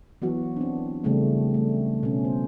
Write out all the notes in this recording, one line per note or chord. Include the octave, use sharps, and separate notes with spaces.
E3 F#3 B3 F#4
C4 D4
C#3 E3 G3 A3 C4
A3
B2 C#4
C5